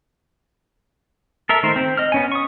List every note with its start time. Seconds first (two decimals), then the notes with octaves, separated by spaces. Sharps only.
1.49 A4 A#4 E5
1.63 D#3 A3 D#4 A#4 C5
1.76 C4
1.97 D#5 F6
2.12 B3 C#4 G#5
2.32 C#6 D#6